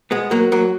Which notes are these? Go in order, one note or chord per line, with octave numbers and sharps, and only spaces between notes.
G#3 B3
F#3 A#3
F#3 A#3